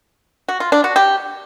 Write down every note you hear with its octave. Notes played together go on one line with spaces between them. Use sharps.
F#4
F4
D4
F#4
G4